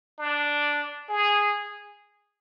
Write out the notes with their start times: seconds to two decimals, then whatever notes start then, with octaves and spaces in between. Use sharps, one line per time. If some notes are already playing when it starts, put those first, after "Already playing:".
0.19 D4
1.09 G#4